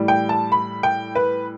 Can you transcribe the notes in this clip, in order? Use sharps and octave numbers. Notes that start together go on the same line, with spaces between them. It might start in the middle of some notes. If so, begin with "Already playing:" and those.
Already playing: A2 E3 G3
G5
A5
B5
G5
B4